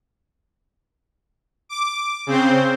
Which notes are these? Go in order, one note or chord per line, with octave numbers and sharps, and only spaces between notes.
D6
C#3 C4 C5